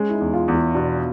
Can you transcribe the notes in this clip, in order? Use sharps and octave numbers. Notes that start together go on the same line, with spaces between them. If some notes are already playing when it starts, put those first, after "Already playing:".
Already playing: G#3 C#4
E4
D#4
E2
F4
E2
E4
B2 D4